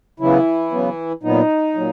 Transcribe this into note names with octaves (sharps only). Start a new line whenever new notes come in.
C#3 E3 F#3 B3 E4
C#3 F#3 B3
A#2 F#3 B3 D#4
A#2 F#3